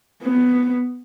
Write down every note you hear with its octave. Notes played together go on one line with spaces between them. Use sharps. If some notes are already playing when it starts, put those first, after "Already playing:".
B3